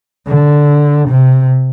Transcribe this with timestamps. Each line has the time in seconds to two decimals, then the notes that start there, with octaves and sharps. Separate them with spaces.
0.28 D3
1.08 C3